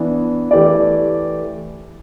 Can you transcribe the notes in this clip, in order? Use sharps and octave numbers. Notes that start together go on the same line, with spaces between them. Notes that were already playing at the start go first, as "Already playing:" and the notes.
Already playing: E3 B3 D4
E3 A3 G4 D5